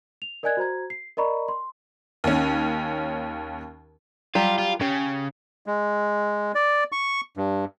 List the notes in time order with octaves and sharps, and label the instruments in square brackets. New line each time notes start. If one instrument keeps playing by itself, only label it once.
[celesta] F7
A#4 D5 D#5 G#5 F#6 G#6
F#4 C5 A#5 G#6
C7
A#4 D5 D#5 A#5 B5 C#6
C6
[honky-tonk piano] D#2 C#4
[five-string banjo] F#3 G3 G4 [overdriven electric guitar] F4
[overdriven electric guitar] F4
[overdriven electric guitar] C#3 [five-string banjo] G4
[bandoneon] G#3
D5
C#6
G2